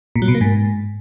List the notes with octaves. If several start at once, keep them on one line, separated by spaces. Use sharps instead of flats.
A#2
F#3
B2
A#3
G#2